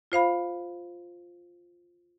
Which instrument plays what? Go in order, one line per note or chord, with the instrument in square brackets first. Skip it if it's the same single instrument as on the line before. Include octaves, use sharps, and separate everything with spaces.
[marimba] F4 C5 F5 B5